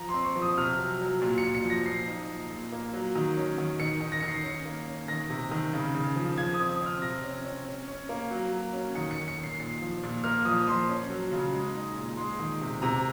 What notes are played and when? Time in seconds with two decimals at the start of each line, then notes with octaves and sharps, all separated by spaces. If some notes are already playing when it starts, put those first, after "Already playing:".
Already playing: F3 A#5
0.09 C6
0.14 C4
0.25 C#6
0.36 F3
0.42 D#6
0.58 C3 F6
0.79 F#3
1.01 F#3
1.22 A#2
1.38 C#7
1.43 A#2
1.55 C#7
1.64 F3
1.70 A#6
1.86 A#2 C7
2.07 D#4
2.29 A#2
2.50 A#2
2.72 A#3
2.93 F#3
3.16 D#3
3.37 C#4
3.58 D#3
3.79 D#3 C#7
4.01 D#3
4.12 A#6
4.20 D#3 C#7
4.28 C7
4.44 C#4 C#7
4.65 A#3
4.88 C#4
5.08 D#3 A#6
5.30 C3
5.51 D#3
5.73 C#3
5.95 C#3
6.16 F3
6.37 F3 G#6
6.54 D#6
6.60 C4
6.69 D#6
6.81 C4
6.86 F6
7.02 C3 A#6
7.24 C#4
7.44 C#4
7.66 C#4
7.88 C#4
8.09 A#3
8.30 F#3
8.53 F#3
8.73 C#4
8.95 D#3 C#7
9.11 C#7
9.17 D#3
9.28 C#7
9.38 D#3
9.44 C7
9.60 A#2 C7
9.82 F3
10.03 A#2
10.24 A#3 F6
10.45 F3 D#6
10.68 F3 C6
10.89 C#4
11.10 F#3
11.32 C#3
11.53 G#3
11.75 D#4
11.96 A#2
12.17 G#3 C6
12.39 D#3
12.61 C3
12.82 C3 A#5